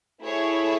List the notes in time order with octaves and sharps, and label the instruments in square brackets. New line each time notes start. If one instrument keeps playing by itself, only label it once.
[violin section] A3 E4 G#4 C#5